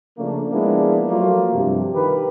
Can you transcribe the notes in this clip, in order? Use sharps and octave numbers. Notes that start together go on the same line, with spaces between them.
C#3 F3 A3 A#3 D4
F3 G#3 A#3 B3 D4 E4
F3 F#3 A3 A#3 F4
G2 C3 F3
C3 D#3 G4 A#4 B4